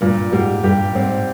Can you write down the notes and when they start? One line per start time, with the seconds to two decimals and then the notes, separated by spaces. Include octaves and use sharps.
0.01 G2 A#2
0.33 G#2 G3
0.63 G2 G4
0.95 G#2 C4